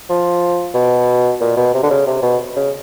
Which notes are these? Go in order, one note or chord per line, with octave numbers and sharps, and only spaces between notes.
F3
B2
A#2
B2
C3
D3
C#3
C3
B2
C#3